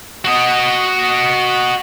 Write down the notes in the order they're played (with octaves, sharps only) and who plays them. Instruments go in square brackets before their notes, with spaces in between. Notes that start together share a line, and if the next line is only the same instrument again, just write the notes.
[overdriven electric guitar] F#4 D#5